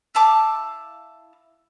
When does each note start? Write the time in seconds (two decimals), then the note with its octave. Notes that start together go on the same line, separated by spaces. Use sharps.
0.15 E4 F5 A5 D6